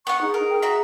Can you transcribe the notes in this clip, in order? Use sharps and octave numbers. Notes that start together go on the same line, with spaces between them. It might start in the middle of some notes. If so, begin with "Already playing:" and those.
B3 F#5 C#6
D#4 G#4
A#4
G5
F#4 E5 A#5